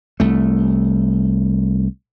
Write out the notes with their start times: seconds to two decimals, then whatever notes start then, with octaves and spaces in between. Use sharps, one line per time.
0.20 C2 A3